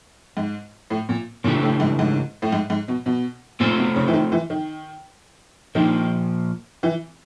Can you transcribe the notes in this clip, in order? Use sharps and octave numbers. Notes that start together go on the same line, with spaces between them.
G#2
A2
A#2
A#2 C#3 E3 A3 D4 G4
A2
G#2
G#2
A2
G#2
G#2
B2
B2
A#2 A3 C4 F4 A4 C5
B2
C#3
E3
D#3
E3
D#3
A#2 D#3 F3 A#3
E3